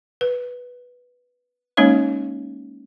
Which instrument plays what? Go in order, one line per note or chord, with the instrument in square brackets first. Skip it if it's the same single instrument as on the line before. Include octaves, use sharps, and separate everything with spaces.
[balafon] B4
G#3 A#3 C#4 D#4 C#5 F5